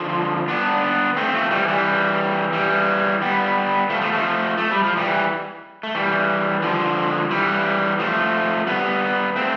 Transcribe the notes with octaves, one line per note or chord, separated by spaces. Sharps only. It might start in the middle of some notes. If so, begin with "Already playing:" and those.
Already playing: D3 F3
B3 D4
A3 C4
F3 A3
E3 G3
E3 G3
E3 G3
G3 B3
F3 A3
F3 A3
F3 A3
A3
G3
F3
E3 G3
A3
E3 G3
D3 F3
E3 G3
F3 A3
G3 B3
A3 C4